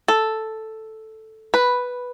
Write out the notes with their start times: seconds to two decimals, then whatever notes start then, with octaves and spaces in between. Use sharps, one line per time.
0.08 A4
1.54 B4